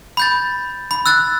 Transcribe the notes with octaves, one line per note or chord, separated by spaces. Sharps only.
B5 G6 A6
B5
E6 F#6 A6